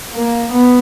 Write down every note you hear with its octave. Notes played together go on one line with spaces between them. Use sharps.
A#3
B3